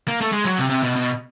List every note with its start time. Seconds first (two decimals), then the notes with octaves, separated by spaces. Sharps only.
0.08 A#3
0.21 A3
0.32 G#3
0.45 F#3
0.58 C3
0.69 C3
0.83 B2
0.96 B2